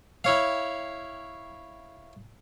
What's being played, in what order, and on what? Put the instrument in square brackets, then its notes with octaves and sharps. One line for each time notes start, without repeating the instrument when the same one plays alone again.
[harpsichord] E4 C#5 F5